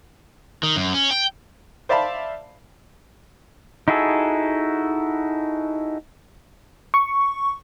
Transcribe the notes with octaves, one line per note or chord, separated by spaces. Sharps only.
D#3
F#2
C#4
G5
C5 D5 E5 F5 A5 B5
D#4 E4 F#4 G#4 A4
C#6